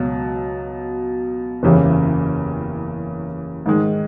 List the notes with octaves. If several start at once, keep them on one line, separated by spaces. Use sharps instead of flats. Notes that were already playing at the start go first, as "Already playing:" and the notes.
Already playing: C#2 B2 F#3
F#1 E2 C#3 E3 G3
G#2 D#3 G#3